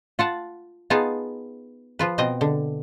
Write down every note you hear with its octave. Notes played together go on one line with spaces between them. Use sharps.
F4 F#5 A5
B3 D#4 F4 G#4 A5
F3 F4 B4
B2 C4 D#5
D3